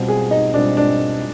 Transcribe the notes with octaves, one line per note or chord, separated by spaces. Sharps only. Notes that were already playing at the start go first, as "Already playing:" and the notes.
Already playing: B2 G3 C4 F4
G#4
D#4
B2 G3 C4 D4 F4
D4